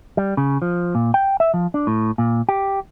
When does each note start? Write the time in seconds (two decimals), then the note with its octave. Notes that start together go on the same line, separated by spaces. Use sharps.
0.17 G3
0.37 C#3
0.62 F3
0.95 A#2
1.14 G5
1.40 E5
1.54 F3
1.74 D4
1.87 A2
2.18 A#2
2.49 G4